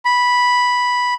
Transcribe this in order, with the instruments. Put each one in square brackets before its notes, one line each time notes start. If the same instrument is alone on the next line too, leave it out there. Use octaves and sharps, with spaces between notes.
[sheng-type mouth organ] B5